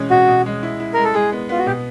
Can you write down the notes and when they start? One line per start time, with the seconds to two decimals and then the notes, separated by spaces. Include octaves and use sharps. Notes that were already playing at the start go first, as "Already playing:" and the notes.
Already playing: B2 E3 G#3 C#4
0.11 B2 F#4
0.28 B2
0.46 G#3
0.63 E4
0.80 E4
0.94 G#3 A#4
1.04 A4
1.14 G#3 G#4
1.32 B3
1.49 B3 F4
1.59 F#4
1.66 B2 G4